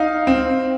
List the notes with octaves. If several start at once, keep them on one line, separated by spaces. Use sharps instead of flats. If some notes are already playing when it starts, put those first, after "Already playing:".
Already playing: D#4 F5
C4